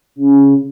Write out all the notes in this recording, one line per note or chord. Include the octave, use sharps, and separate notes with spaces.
C#3